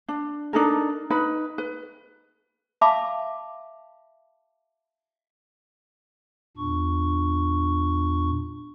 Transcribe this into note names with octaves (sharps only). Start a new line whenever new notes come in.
D4
D4 D#4 A4 A#4
D#4 B4 B5
B4
E5 F5 A5 B5 D6
E2 A#2 D4 C#6